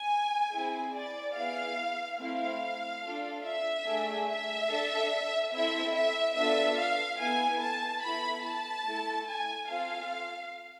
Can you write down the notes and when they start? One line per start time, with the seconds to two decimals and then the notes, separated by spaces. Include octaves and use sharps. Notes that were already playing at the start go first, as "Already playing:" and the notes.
Already playing: G#5
0.52 C4 E4 G#4
0.93 D5
1.35 B3 E4 G#4 F5
2.19 A3 C4 E4 F5
3.02 D4 F4 A4
3.44 E5
3.86 A3 D4 G#4
4.28 E5
4.69 D4 A4
5.52 C4 E4 A4 E5
5.94 E5
6.35 B3 D4 F4 A4 E5
6.78 F5
7.20 B3 E4 A4 G#5
7.61 A5
8.02 B3 E4 A4 B5
8.45 A5
8.86 A3 E4 A4
9.28 G#5
9.70 C4 F4 A4 F5